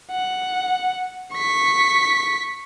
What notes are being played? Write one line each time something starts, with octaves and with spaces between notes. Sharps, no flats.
F#5
C#6 B6